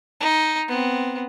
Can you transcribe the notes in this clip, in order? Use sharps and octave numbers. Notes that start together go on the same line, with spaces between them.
D#4
B3 C4